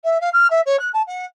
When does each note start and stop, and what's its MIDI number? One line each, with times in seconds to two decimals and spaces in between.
0.04 0.18 76
0.21 0.29 77
0.33 0.50 89
0.50 0.61 76
0.66 0.79 73
0.79 0.89 90
0.93 1.02 81
1.07 1.25 78